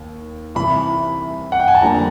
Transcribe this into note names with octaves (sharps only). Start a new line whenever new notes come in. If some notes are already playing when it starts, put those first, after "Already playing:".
Already playing: D#2
C2 C3 E3 B5
F#5
G5
G#5
A5
F2 D3 G3 A#3 D4 A#5